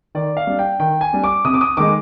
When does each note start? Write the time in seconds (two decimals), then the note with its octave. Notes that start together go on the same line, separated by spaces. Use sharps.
0.15 D#3 D5
0.37 F5
0.47 G3 D4
0.59 G5
0.80 D#3 G5
1.01 G#5
1.13 G3 D4
1.24 D6
1.45 C3 D#6
1.54 D6
1.61 D#6
1.77 D#3 G#3 D#4 D6